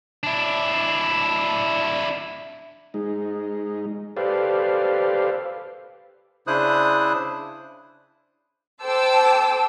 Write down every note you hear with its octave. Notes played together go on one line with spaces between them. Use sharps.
D4 E4
G#3 D#4
G4 A4 B4 C5 D5 F5
C#3 D4 E4 C5 D#6 F#6
A4 C5 G5 A5 D6 E6